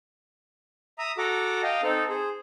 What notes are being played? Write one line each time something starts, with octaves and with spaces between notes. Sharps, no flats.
E5 A#5 D#6
F#4 A4 A#5 D6
D#5 F5 G5
C4 D#4 A4
G#4 C5